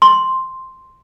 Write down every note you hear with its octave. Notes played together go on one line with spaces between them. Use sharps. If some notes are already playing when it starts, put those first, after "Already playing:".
C6